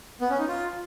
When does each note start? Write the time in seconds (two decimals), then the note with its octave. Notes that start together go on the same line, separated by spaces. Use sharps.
0.21 B3
0.30 C#4
0.39 D#4
0.48 F4